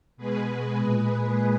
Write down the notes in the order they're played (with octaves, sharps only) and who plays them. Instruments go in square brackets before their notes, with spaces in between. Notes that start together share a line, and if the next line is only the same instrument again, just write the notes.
[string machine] B2 G#3 G#4 B4
A#2 G#3 G#4 B4